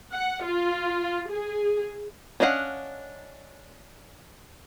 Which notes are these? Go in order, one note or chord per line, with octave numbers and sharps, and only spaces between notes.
F#5
F4
G#4
C#4 D4 D#5 F5 F#5